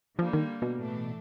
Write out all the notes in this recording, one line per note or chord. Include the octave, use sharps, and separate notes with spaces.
D3 F3 G3 A#3
D#3
B2
A2 E3 A3 D4